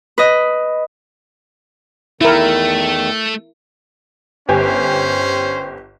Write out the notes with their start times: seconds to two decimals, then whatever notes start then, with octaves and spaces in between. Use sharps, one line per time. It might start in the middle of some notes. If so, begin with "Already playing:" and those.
0.18 B4 D#5
2.21 E2 D#3 A3 E4 A#4
4.49 G1 C#4 G4 C5 G#5